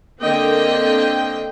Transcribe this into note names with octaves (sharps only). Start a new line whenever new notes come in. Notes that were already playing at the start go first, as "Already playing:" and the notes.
D3 A#3 C4 D#5 G5